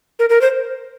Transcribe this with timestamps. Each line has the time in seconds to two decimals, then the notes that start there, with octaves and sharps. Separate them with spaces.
0.19 A#4
0.30 A#4
0.41 C5